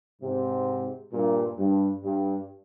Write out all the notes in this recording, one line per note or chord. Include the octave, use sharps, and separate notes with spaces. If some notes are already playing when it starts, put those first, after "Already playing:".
G#2 C3
G2 A#2
G2
G2